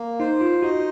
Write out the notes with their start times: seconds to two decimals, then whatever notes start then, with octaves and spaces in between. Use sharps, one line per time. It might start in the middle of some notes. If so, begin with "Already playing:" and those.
Already playing: A#3
0.20 D#4 C5
0.41 F4
0.62 D#4 F#4